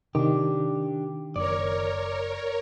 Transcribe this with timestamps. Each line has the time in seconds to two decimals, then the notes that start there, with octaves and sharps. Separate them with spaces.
0.15 C3 D#3 D4 G4
1.36 F#1 A#4 C#5 D5